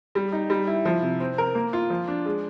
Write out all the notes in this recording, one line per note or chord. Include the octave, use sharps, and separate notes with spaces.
G3
D#4
G3
E4
F3
C3
C4
A#4
A#3
F4
F3
D4
G#3